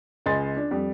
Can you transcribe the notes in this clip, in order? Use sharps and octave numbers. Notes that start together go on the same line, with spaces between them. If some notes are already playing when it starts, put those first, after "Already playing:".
C#2 D#5 G#5 C6 A6
D4
F2 G3